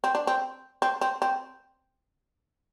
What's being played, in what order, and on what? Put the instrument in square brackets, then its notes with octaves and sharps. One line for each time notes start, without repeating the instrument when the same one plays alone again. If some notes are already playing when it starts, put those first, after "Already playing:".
[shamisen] C4
D4
C4
C4
C4
C4